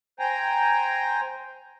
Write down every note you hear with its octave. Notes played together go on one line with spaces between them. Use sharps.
C5 G5 G#5 A#5